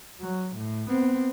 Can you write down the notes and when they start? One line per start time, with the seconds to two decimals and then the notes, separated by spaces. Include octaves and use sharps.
0.21 F#3
0.56 A2
0.88 B3 C4